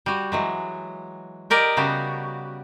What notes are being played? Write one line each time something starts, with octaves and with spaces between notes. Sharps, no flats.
G3 F#4
E3 F#3 G#3
G4 A#4 D5 D#5
C#3 G3 B3 F#4